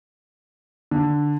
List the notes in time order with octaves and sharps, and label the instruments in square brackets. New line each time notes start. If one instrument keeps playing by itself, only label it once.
[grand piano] D3